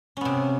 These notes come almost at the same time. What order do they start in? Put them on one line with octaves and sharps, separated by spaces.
C#4 B3 C3